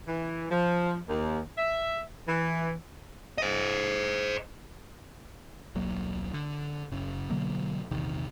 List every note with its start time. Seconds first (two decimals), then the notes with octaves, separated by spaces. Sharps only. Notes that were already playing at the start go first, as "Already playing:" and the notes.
0.07 E3
0.51 F3
1.08 D#2
1.57 E5
2.27 E3
3.38 C5 D#5
5.75 D#1 B1 F#3 A#3
6.34 D3
6.92 F#1 C#3
7.30 B2 D3 F#3 A#3
7.91 A#1 E2 C3 D#3